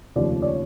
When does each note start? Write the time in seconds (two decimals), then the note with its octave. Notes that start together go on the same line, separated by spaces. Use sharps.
0.16 F1 D#2 C#3 F3 A3 D5
0.42 D5
0.46 C#5